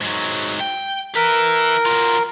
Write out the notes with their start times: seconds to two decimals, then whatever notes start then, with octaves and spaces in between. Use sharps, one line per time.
0.01 G#2 F#3
0.60 G5
1.16 E4 A#4 B4
1.86 F#3 F4